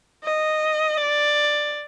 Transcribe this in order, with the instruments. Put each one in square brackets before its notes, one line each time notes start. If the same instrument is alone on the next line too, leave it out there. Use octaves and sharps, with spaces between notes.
[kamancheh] D#5
D5